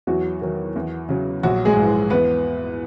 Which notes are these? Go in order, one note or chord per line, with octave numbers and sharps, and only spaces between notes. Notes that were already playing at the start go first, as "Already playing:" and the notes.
E2 F#3 F#4
D#3 F#3
E2
C#3 F#3
A#1 F#3 F#4
G#3 G#4
G#2 E3
E2 B3 B4